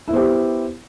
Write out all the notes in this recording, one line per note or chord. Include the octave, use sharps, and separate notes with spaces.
B3 E4 G4 C5